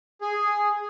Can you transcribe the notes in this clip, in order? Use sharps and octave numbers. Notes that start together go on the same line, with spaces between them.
G#4